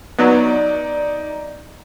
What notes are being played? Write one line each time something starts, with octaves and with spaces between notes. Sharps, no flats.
F#3 B3 D#4 D5